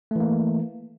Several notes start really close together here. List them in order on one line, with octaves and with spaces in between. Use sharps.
A3 E3 A#3